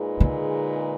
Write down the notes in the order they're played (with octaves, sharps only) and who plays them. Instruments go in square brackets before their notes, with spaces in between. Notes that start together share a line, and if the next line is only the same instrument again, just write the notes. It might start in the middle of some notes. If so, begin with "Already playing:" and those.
Already playing: [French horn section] A#2 G#3 D#4 G#4 B4
[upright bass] D3